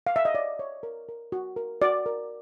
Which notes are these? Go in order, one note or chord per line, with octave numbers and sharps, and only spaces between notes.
F5
E5
D#5
C#5 D5
C#5
A#4
A#4
F#4
A#4
F#4 D5
A#4